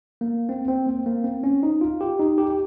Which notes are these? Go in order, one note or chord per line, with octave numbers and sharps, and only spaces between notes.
A#3
C4
C4
A#3
A#3
C4
C#4
D#4
F4
G4
D#4
G4
G4